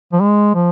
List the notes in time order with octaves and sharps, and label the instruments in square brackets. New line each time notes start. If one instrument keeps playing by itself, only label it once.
[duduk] F3
G#3
F3